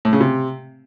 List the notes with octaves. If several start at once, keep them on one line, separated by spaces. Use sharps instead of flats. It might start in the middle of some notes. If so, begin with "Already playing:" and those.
A2
C#3
C3